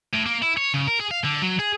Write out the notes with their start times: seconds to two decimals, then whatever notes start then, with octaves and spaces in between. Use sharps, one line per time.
0.13 A2
0.26 A#3
0.42 E4
0.58 C#5
0.74 C#3
0.88 A#4
1.00 G#4
1.11 F5
1.24 D3
1.42 F#3
1.59 G#4